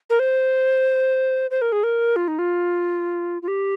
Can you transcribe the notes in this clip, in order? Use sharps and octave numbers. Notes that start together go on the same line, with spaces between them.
A#4
C5
C5
A#4
G#4
A#4
F4
D#4
F4
F4
G4